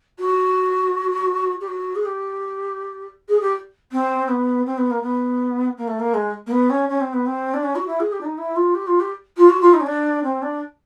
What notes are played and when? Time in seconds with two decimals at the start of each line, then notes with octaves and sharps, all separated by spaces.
0.19 F#4
1.61 G4
1.68 F#4
1.95 G#4
2.05 G4
3.29 G#4
3.41 G4
3.92 C4
4.28 B3
4.66 C4
4.78 B3
4.91 A#3
5.02 B3
5.78 A#3
5.88 A3
5.99 A#3
6.14 G#3
6.46 A#3
6.51 B3
6.70 C#4
6.89 C#4
7.01 C4
7.13 B3
7.26 C4
7.54 D4
7.63 C#4
7.75 F#4
7.87 E4
8.00 G#4
8.12 G4
8.21 D4
8.25 D#4
8.38 E4
8.56 F4
8.75 G4
8.87 F4
9.00 G4
9.37 F4
9.49 F#4
9.61 F4
9.73 D#4
9.80 C#4
9.86 D4
10.23 C4
10.42 D4